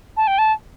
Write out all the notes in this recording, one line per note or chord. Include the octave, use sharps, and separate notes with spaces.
A5
G5
A5